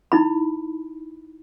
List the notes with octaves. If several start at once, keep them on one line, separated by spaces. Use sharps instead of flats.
D#4 E4 B5